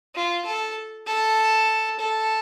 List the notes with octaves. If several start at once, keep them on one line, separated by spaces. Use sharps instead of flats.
F4
A4
A4
A4